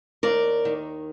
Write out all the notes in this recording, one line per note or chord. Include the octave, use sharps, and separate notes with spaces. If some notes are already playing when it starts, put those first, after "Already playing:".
D#2 A#4 D5
D#3